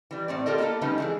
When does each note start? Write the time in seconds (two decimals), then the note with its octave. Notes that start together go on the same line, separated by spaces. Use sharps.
0.11 E3 G3
0.28 A2 C4 D5
0.46 F4 G4 A4 A#4 D#5
0.58 A#3 B3 E4 F4 A4
0.81 F3 G3 G#3 C#4 D#4 B4
0.98 E3 E4 G#4